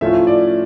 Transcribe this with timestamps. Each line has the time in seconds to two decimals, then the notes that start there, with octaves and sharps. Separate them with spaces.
0.01 A2 F3 A3 C#4 F4 E5
0.27 D5